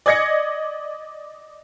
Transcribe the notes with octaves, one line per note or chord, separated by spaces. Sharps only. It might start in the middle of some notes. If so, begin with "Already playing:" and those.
D5 D#5 G#6 A#6 C#7